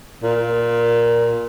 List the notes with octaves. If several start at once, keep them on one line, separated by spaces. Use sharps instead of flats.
A#2